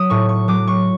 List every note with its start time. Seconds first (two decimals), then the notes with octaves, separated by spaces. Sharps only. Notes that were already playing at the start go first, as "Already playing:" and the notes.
Already playing: F#3 D#6
0.10 A2 C#6
0.29 C#6
0.48 F#3 D6
0.67 C#6